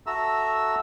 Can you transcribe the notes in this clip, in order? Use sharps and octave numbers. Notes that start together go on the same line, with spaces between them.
F#4 A4 E5 A#5 E6